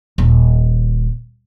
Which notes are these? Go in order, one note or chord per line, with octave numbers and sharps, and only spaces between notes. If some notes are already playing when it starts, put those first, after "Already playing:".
D#1